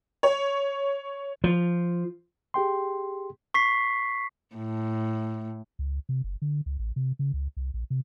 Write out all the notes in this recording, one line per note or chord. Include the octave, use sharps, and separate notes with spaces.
C#5
F3
G4 G#4 G5 C6
C#6 B6 C7
A2
C#2
C3
F#1
D3
C#2
A1
C3
C#3
C#2
C2
A#1
C3